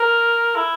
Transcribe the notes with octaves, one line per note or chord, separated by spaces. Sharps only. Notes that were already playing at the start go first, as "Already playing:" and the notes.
Already playing: A#4
E4